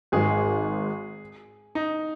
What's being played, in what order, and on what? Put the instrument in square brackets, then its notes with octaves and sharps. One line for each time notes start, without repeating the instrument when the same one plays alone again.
[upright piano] G#1 G#2 G#3 [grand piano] G#4
[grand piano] D#4